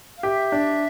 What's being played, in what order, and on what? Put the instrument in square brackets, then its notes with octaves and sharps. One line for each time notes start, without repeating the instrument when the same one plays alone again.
[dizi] F5
[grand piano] G4 [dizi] E5
[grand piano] D4